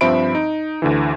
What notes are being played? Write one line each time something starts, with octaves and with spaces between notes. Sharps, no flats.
G2 F3 C4 E5 B5 D7
D#4
D2 D3 E3